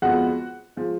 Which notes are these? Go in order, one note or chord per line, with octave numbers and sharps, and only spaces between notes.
F2 F3 G#3 B3 F#4 F#5
F3 G#3